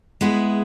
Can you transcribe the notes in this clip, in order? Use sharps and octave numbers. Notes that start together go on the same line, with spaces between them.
G#3 B3 E4 G#4